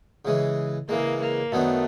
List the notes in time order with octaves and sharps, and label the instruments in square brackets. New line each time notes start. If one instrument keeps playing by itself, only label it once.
[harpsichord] C#3 E3 G#3
[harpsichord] C#3 E3 G#3 [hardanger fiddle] A#3
[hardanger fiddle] A#3
[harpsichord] F#2 D#3 F#3 B3 D4 [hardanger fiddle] A3